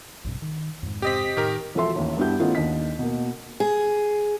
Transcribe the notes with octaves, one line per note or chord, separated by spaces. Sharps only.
A#1 G2 C3
D#3
F2 G#2
C3 C4 G4 D#5 B6
A2 D#3 G4 A#4
E1 F3 F#4 A4 E5 C6
A1 D#2
G2 B3 D4 E4 G4 G6
D#3 A3 B3 C#4 E4 F4
D#2 D4 D#5 B6
B2 A#3
G#4